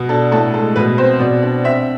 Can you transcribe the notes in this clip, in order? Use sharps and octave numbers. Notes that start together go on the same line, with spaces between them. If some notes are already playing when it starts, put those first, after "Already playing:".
Already playing: B2
D4 A4
A2 A4
G#3 A4
B2 B4
C4 C5
B2 D5
D4
C4 E5